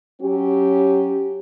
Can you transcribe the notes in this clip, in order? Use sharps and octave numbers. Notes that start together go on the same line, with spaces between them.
F#3 C#4 G4